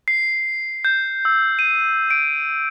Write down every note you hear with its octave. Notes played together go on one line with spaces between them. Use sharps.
C7
G6
E6
D#7
D7